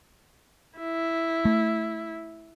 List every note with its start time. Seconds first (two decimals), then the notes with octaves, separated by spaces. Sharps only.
0.78 E4
1.45 A3